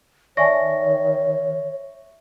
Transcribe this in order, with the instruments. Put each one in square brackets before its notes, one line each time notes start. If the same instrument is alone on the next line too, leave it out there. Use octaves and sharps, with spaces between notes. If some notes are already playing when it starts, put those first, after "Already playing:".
[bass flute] D#3 [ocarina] C#5 [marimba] D5 G#5 A5 [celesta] E5 C#6 A#6